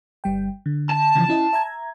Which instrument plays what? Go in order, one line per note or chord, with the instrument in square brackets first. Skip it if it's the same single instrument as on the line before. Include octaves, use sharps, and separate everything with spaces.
[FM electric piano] G1 G3 G5
D3
[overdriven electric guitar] A5
[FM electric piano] C#3 E3 F3
C#4 E4 D#5
E5 A#5 G#6